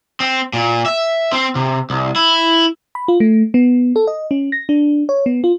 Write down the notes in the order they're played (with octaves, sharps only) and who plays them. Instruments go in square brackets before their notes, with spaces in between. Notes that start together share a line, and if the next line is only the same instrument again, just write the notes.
[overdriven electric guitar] C4
A#2
E5
C4
C3
C2
E4
[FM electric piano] B5
F4
A3
B3
A4
D#5
C#4
A#6
D4
C#5
B3
F4